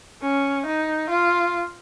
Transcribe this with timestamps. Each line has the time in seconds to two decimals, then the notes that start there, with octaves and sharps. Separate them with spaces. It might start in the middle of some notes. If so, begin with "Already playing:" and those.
0.22 C#4
0.66 D#4
1.10 F4